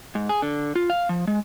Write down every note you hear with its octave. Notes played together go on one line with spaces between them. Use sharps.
G#2
G#4
D3
F4
F5
F3
G#3